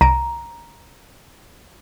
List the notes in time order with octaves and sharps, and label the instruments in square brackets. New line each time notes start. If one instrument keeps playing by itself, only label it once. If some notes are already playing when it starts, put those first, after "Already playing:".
[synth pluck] C2 A#6 D7 [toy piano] A#5